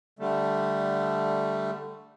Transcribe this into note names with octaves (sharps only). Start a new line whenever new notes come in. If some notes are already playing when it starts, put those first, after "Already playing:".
D3 G3 A3